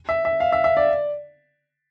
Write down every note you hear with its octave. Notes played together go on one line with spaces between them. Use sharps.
E5
E5
F5
E5
E5
D5